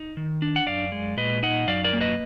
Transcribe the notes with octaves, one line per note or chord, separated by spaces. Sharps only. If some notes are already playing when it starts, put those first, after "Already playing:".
Already playing: D#4
D#3
D4
F#5
F#2 D5 F5
G#3
A#2 B4 D#5
D#4 D#5 F#5
F#2 D5 F5
A#4 D5
A#3
B4 D#5